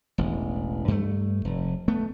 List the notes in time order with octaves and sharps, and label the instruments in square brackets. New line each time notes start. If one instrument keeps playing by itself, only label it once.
[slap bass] E1 A1
G2 A3
F1
A3 B3